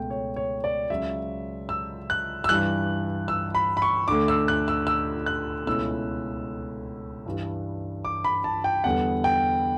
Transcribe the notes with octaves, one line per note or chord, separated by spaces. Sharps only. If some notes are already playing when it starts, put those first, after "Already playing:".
Already playing: C#2 B2 A3 G5
C#5
C#5
D5
C#2 C#3 F#3 E5
E6
F#6
E6
G2 E3 G3 F#6
E6
B5
B5
C#6
D2 D3 A3 D4 D6
E6
F#6
E6
E6
F#6
C#2 B2 A3 C#4 E4 E6
G2 E3 G3 D4
D6
B5
A5
G5
E2 D3 G3 B3 F#5
G5